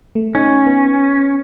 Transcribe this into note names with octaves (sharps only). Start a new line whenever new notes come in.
A3
C#4 D#4
B3